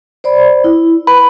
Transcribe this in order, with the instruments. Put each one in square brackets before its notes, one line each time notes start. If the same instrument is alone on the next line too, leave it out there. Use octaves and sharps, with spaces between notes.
[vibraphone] C5 D5 B5
E4
[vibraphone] B4 [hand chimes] B5